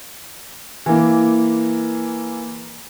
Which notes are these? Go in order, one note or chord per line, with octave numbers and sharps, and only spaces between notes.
E3 A#3